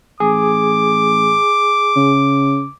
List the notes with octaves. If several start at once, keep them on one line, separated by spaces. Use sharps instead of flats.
A1 G#4 D6
C#3